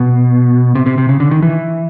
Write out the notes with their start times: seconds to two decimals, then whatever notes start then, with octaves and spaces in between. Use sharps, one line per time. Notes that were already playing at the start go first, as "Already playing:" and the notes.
Already playing: B2
0.75 C3
0.86 C3
0.98 C3
1.09 C#3
1.20 D3
1.31 D#3
1.42 E3